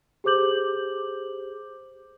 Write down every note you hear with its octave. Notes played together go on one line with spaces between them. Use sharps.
G4 G#4 C5 D6 G6 F#7